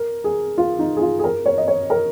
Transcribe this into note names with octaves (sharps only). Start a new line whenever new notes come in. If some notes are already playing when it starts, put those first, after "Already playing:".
Already playing: A#4
G#4
F4
D#4
G#4
F4
G#4
A#4
C#5
D#5
C#5
A#4